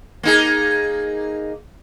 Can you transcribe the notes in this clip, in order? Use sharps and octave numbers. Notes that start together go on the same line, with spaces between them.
A#3 D#4 G#4